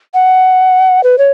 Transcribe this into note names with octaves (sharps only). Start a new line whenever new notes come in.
F#5
B4
C#5